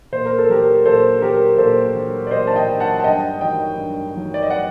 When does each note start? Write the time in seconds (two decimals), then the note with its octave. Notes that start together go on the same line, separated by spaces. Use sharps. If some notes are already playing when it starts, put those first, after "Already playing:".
0.12 A#2 C5
0.26 A#4
0.38 A4
0.49 F#3 G4 A#4
0.86 A#2 A4 C5
1.22 F#3 G4 A#4
1.58 A#2 A4 C5
1.95 F#3
2.27 D5
2.31 A#2 C5 D#5
2.47 A5
2.56 D#5 G5
2.68 F#3
2.80 F#5 A5
3.00 A5
3.04 G2 D#5 G5
3.41 D#3 F#3 D#5 G5
3.78 G2
4.15 D#3 F#3
4.34 D5
4.42 D#5
4.50 D5 F#5